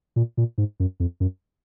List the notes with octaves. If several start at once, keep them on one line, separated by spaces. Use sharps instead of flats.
A#2
A#2
G#2
F#2
F2
F#2